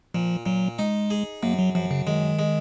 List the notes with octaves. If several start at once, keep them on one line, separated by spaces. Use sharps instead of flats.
A#2 F3
A#2 F#3
G#3 D#4
G#4
F#2 A#3
F#3
F#2 F3
C#3
D#3 G#3
G#3